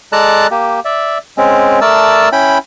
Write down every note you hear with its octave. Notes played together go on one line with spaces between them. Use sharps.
G#3 A4 D5 A5 A#5 F#6
A#3 G4
D5 E5
G#3 C4 C#4
A3 A#4 D5 A5 E6
C#4 E4 G5 B5